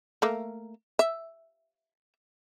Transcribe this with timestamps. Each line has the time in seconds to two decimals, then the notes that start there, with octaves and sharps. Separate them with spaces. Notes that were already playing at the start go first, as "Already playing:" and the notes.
0.22 A3 A#3
0.99 E5